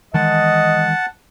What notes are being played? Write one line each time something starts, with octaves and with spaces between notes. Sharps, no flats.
D#3 E3 G#3 D#5 F#5 A5